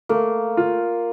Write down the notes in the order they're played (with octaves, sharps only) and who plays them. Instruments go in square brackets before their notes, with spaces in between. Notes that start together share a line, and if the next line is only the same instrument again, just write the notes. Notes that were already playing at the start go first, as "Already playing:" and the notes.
[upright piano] A3 [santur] A#3
[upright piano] F4